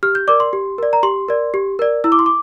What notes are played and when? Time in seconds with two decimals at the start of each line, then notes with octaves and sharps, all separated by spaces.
0.03 G4 F6
0.15 G6
0.28 A#4 D5 D6
0.40 C6
0.53 G4
0.78 A#4 D5
0.93 A#5
1.03 G4 C6
1.29 A#4 D5
1.54 G4
1.79 A#4 D5
2.04 E4 E6
2.12 D6
2.19 C6
2.26 D6